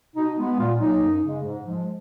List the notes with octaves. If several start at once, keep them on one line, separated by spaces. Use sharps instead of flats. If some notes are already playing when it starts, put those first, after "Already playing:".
B2 D#4
G#3 B3
A#2 F4
F#3 A#3 D#4
F#2
C#3 G#3
G#2
F3 G#3